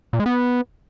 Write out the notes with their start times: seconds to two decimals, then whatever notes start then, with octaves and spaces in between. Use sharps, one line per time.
0.13 A#2
0.19 G#3
0.26 B3